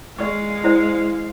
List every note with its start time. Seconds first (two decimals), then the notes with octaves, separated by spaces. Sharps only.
0.19 G#3 D5 F5 C#6
0.64 E4 C5 D5